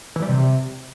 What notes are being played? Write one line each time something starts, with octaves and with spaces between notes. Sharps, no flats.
E3
G3
C3